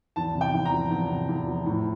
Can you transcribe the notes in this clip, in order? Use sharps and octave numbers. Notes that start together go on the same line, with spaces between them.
E2 A5
C3
G5
E2
A#5
F3
E2
C3
E2
F3
A2